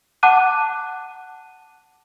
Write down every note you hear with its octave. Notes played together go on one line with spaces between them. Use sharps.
F#5 A5 D6 F#6 D#7